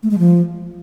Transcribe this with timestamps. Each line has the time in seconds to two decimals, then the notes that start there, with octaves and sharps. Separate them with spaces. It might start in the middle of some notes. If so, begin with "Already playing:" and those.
0.03 A3
0.11 G#3
0.19 F3